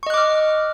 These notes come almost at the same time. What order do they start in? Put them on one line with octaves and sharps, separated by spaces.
C#6 D#5 F#6 D6 F6